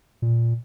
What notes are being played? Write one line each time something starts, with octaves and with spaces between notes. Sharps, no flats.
A#2